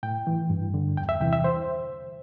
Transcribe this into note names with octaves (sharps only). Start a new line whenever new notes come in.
A2 G5
E3
G2
D3
E2 G5
E5
C3 E3 G5
E5
C5